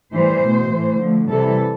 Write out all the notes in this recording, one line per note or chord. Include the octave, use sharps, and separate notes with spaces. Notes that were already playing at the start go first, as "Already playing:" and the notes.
A2 E3 G3 C5
B2 A3
A2 E3 A3
D3 F3 A3
C3 E3 G3 A4